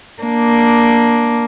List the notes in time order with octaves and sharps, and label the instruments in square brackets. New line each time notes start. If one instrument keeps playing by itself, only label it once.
[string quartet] A#3 D4